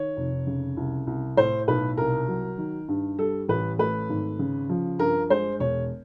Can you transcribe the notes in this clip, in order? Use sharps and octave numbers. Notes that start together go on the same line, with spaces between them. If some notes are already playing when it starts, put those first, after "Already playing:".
Already playing: D#3 C#5
F1
C#3
C2
C2
A2 C5
B1 B4
C2 A#4
F#3
D#3
G2
G3 A4
A1 B4
A3 B4
G#1
C#3
F3
G2 A#4
G#3 C5
E1 C#5